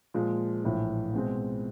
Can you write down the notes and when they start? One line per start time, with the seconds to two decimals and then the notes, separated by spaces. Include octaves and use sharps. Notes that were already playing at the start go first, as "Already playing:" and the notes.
0.14 A#2 F3 G#3
0.64 A#1 A2 E3
1.14 B2 G#3 C4